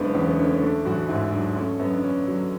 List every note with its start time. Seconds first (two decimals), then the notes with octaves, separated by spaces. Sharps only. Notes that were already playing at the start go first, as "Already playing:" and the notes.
Already playing: F#1 G#3 A3 B3 D4
0.14 E2 C#4
0.27 B3
0.39 D3 C#4
0.50 C#4
0.62 A3 D4
0.85 A1 F#4
1.08 G#2 E4
1.32 F#3 D4
1.56 A3 C#4
1.79 F#2 B3
1.93 D4
2.04 D3 C#4
2.27 F#3